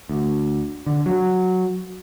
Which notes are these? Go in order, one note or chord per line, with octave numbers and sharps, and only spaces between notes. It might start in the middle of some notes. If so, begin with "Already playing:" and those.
D2
D3
F#3